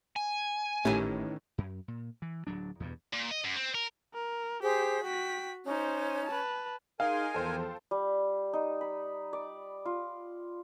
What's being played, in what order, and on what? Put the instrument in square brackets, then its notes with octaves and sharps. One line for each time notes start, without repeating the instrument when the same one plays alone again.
[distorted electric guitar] G#5
[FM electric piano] G#1 A3 G4 [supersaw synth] A2 [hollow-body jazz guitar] D#3 E3 C#4
[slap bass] F#2
A#2
E3
D1 F#3 D4
E2 G2 B2
[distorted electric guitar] A#2
D#5
F#2
C4
A#4
[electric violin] A#4
[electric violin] G4 B6 [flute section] G#4 C5
[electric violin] F#4 B6 [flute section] G5
[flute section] C#4 [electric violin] D#4 C5
[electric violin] B4 A5
[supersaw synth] D#4 G#4 C6 [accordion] A#4 G#5 [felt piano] F5
[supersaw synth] E2 F3 [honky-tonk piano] A4 C5 G5
[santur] G3
D#4
B5
D5
F4